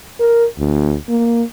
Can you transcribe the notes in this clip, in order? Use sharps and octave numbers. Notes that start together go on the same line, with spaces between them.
A#4
D2
A#3